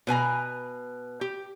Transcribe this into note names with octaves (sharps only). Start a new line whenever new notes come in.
B2 B4 G#5 A#5
G4